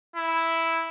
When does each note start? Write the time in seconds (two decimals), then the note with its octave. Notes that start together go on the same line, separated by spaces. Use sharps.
0.16 E4